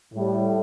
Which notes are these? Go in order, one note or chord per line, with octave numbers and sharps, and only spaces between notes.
A2 G3